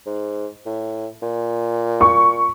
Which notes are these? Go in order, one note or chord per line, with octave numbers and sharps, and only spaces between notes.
G#2
A2
A#2
C#6